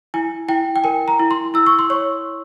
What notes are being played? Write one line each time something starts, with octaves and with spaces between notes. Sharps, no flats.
E4 G#5
E4 G5
G5
A#4 G#5
A#5
E4
C6
E4 E6
C#6
C6
C#5 C#6